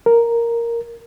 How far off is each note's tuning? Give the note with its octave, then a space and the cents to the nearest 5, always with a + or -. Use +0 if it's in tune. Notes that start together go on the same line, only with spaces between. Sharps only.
A#4 +0